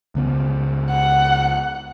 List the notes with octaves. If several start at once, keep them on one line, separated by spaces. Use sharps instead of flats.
C#2 C#3 B3
F#5